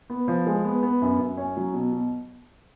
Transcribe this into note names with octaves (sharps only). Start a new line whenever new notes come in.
B3
F3
G#3
B3
B3
F#2
F#2
C#4
F#3
B2
B2